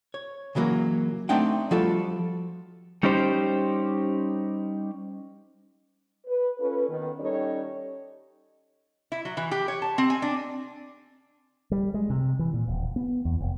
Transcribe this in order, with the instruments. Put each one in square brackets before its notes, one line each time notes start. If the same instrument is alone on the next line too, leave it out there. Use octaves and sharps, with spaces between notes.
[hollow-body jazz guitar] C#5
C#3 E3 F#3 A#3
A3 C4 D4 D#4 F#5 G5
F3 G3 F4 F#4 A4
[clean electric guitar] G3 C#4 D#4 G4 C5
[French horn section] B4
C#4 F4 A4 B4
D#3 B3
G3 C#4 D#4 G4 A4 C#5
[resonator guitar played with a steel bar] E4
F#3
E3
G4
C#5
A5
C4
G#5
D4
[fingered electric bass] G3
G#3
C3
E3
A#2
D#1
B3
E2
F1